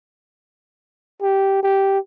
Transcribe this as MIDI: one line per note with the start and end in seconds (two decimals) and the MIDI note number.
1.22 1.62 67
1.63 1.98 67